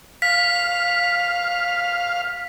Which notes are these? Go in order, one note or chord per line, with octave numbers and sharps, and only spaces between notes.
F5 B6